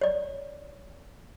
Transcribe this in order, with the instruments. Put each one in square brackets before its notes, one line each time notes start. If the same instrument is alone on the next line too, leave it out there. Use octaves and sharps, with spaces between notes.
[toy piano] C#5 D5